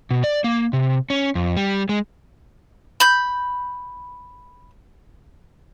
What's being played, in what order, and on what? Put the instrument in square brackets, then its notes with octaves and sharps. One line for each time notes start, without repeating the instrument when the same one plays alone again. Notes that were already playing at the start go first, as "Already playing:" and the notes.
[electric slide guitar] B2
D5
A#3
C3
C#4
F2
G3
G#3
[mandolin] B5 G6